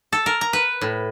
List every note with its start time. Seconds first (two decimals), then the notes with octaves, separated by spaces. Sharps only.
0.13 A4
0.26 A#4
0.41 A#5
0.53 B4
0.81 A2